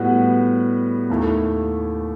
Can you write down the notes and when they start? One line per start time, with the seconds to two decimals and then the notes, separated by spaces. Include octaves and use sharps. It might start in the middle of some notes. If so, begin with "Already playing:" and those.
Already playing: A2 G3 B3 F#4 B4
1.10 D#2 D#3 A3 E4